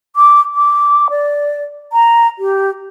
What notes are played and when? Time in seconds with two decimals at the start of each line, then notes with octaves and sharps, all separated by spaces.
0.16 D6
0.55 D6
1.10 D5
1.92 A#5
2.39 G4